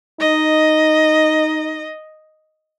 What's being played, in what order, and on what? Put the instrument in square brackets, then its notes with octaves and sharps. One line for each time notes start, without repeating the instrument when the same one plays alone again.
[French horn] D#4 [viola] D#5